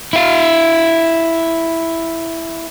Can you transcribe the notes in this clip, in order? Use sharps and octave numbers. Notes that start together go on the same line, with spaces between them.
E4 F5